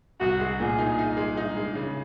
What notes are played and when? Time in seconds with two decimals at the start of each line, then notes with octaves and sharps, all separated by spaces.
0.20 C2 F#4
0.40 G#3
0.60 A#2 G#4
0.78 D#4
0.99 D#4
1.17 G#3
1.37 D#4
1.57 G#3
1.75 C#3